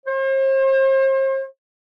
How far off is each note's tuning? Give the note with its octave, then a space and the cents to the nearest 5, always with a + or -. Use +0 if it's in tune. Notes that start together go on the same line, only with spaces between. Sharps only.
C5 +40